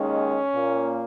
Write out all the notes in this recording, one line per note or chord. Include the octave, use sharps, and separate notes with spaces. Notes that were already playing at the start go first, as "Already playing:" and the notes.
Already playing: D#2 D#3 G#3 C#4
A#2 A#3